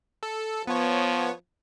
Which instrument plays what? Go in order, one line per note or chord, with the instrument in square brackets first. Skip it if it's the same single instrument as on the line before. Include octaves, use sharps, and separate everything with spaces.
[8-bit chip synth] A4
[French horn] F3 [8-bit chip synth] B3 C#5